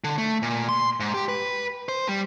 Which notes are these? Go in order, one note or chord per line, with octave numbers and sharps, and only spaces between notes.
D3
A3
A#2
C6
G#2
G4
B4
C5
G3